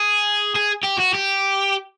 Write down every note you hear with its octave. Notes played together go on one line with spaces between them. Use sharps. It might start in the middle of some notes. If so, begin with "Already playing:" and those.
Already playing: G#4
G#4
G4
F#4
G4